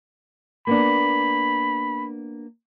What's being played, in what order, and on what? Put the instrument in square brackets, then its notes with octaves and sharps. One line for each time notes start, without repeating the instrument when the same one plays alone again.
[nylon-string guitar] A#3 B3 D4 [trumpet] B5